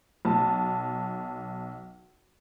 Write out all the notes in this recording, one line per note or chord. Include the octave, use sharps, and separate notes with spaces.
B1 A5